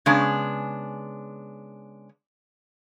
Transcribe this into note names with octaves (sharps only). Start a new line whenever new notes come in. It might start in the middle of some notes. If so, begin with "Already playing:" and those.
C#3 G#3 B3 D4